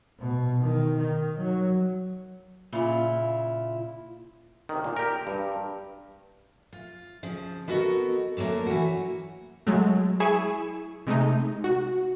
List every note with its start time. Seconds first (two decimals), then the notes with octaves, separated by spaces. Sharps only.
0.19 B2
0.61 D#3
0.97 D#3
1.38 F#3
2.72 A#2 C#3 E4 F4
4.69 C3 D#3
4.84 A#2
4.96 G4 A#4
5.27 G2
6.73 F4
7.23 C#3 F3
7.68 B3 E4 F#4 A4 A#4 D#5
8.37 D3 F#3 A3 A#3 C#4
8.67 E3 F#4
9.67 F#3 G#3 A3
10.20 E4 G#4 G#5 C#6 E7
11.07 C3 G#3 A3 D#4
11.64 F#4